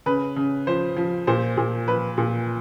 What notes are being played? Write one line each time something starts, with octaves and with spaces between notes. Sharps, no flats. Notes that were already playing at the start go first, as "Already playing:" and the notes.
C#3 B4
C#3
F3 C5
F3
A#2 C5
A#2
F3 B4
A#2